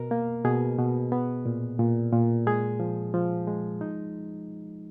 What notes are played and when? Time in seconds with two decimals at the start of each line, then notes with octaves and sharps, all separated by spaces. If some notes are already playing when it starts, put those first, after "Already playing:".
Already playing: B2 A#4
0.11 A#3
0.45 B2 G#4
0.78 B2
1.12 B3
1.46 A#2
1.79 A#2
2.13 A#2
2.47 G#3 G#4
2.80 F3
3.14 F3
3.47 G#3
3.81 D#4